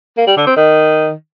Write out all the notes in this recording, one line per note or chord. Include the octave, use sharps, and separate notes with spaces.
A#3
G3
D3
C4
D#3